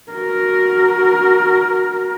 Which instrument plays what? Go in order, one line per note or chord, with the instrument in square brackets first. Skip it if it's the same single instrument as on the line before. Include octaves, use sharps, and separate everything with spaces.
[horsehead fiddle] F#4 A#4